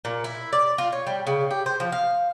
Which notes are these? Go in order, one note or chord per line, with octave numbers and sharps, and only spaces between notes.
A#2
E4
D5
F4
C#5
G3
C#3
G4
C5
F3
F5